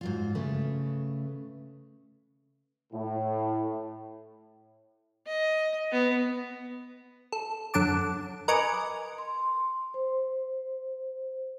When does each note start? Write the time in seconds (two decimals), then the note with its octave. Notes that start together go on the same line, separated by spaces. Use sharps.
0.01 G#2 F#3 F4
0.35 C#3 A3 B4
2.93 A2
5.27 D#5
5.92 B3
7.32 A4
7.74 F#2 D3 A4 F#5 A5 D6
8.48 A#4 B4 D#5 G#5 C#6 D6
9.18 C6
9.94 C5